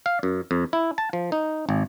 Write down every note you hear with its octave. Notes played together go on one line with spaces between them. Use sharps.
F5
F#2
F2
E4
A5
F3
D#4
G#1